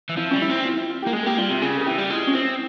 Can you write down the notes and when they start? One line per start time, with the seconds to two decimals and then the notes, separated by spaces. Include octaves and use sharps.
0.09 E3
0.17 F3 E4
0.31 G3 C#4
0.42 E4
0.50 C4
0.65 F4
0.77 E4
0.90 F4
1.02 G4
1.07 A#3
1.13 G#3 G#4
1.26 A#3 G4
1.38 G3 F4
1.50 C3
1.62 C#3 G#4
1.81 G#4
1.86 E3 G4
1.98 G3
2.10 G#3 F4
2.27 C#4
2.35 C4 E4